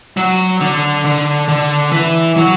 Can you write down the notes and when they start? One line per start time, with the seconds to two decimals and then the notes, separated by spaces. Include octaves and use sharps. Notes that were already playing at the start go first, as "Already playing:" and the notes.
0.17 F#3
0.61 D3
1.05 D3
1.48 D3
1.92 E3
2.36 F#3